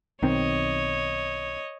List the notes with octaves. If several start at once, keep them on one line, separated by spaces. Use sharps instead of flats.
B1 D#3 C4 C#5 D#5